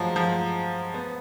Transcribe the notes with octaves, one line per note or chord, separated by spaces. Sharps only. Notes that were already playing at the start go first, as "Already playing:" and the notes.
Already playing: F3 F#3 G#3
F3
B3